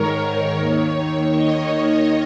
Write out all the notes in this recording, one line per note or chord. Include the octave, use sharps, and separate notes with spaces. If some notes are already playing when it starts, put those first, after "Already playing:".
Already playing: G#2 D#3 A#4 C#5
D#2 D#3 C#5
D#5